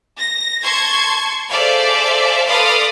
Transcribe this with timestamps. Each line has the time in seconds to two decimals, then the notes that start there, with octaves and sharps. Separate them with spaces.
0.20 A#6
0.63 A5 C6 C#6 G#6
1.49 G#4 A4 C5 D5 E5 F5
2.47 A4 B4 D5 F5 C6 D#6